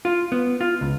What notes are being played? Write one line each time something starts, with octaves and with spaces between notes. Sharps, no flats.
F4
B3
F4
C#2